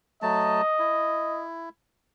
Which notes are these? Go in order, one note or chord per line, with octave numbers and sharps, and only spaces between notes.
F#3 A3 D#5 A5
E4